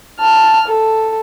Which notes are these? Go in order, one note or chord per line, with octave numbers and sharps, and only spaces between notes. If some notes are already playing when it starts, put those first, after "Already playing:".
A5 F6
A4